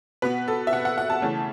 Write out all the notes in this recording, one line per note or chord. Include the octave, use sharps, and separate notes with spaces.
B2 B3 B4
A4
E5
B2 B3 F#5
F#5
F#5
A5
C#3 E3 A3 C#4